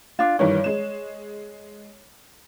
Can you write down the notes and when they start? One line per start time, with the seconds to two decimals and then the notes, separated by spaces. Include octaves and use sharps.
0.19 D4 F4
0.39 G2 D#3 E3 C#5
0.64 G#3 E7